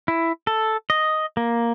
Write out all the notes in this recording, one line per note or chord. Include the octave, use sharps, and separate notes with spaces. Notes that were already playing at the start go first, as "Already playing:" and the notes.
E4
A4
D#5
A#3